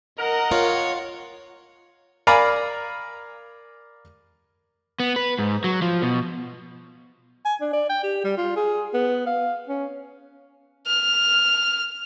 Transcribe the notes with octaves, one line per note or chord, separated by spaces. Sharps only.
A#4 D#5 F#5
F4 C#5
A#4 D5 F5 G#5 A#5 B5
B3
B4
G#2
F#3
F3
B2
G#5
D4
D5
G5
G4
G3
F4
G#4
B3
F5
C#4
F6